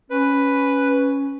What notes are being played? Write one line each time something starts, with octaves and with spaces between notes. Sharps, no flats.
C#4 B4